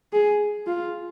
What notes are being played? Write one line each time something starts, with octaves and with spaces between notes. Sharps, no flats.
G#4
F4